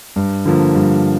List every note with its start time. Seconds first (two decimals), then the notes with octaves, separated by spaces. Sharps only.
0.16 G2
0.45 D3 F3 A#3
0.75 G2